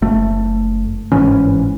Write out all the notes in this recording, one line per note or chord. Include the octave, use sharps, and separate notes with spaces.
F#1 A3
G1 G#2 E3 C#4